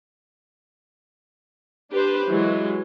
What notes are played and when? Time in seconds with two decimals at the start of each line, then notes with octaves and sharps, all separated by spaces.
1.92 D4 G4 B4 C5
2.27 E3 F#3 G#3